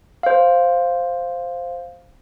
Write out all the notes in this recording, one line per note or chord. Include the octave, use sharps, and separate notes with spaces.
C5 F5